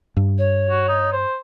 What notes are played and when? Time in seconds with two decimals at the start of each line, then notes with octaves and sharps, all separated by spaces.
0.17 G2
0.38 C#5
0.69 F#4
0.89 D#4
1.12 C5